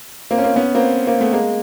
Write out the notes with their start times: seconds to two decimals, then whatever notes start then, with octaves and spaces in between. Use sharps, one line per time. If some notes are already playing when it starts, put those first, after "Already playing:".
0.31 A#3 C4
0.38 C#4
0.44 A#3 C4
0.56 B3 C#4
0.75 A#3 C4
1.07 A#3 C4
1.20 A3 B3
1.33 G#3 A#3